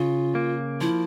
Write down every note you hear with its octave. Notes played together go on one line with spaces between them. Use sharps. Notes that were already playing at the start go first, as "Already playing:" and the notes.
Already playing: C#3 F4
A#3
F3 E4